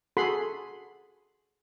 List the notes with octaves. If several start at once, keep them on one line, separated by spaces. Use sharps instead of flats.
F#4 G#4 A4 F#5 B5 C6